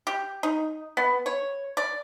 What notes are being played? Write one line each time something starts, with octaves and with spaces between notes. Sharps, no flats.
G4
D#4
B3
C#5
D5